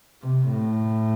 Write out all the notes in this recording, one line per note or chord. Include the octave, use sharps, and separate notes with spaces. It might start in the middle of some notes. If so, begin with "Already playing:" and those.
C3
A2